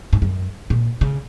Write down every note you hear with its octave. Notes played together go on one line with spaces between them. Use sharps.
G#2
F#2
A#2
C#3